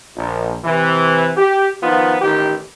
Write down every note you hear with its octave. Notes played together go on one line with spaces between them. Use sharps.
A#1
C3 E3
G4
D#3 F3 B3 D#4 F4
A1 D#3 G4